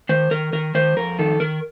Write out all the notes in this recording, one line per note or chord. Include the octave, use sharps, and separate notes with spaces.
D#3 C5
D#3 A#4
D#3 A#4
D#3 C5
F2 A#4
D#3 A4
D#3 A#4